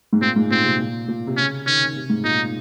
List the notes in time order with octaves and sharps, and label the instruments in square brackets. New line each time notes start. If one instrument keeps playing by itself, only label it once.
[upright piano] G#2
[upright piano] A#2 [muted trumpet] C4
[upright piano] G#2
[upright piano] A#2 [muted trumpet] C4
[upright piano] C3
A#2
A#2
C3
[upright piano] C#3 [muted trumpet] C#4
[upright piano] D#3 [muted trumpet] C#4
[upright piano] C#3
C3
G#2
[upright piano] A#2 [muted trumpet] D#4